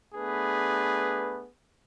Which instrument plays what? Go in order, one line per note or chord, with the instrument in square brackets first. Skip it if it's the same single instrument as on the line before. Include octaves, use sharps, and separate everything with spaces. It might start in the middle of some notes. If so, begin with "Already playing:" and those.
[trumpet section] A3 B3 D4 G#4 B4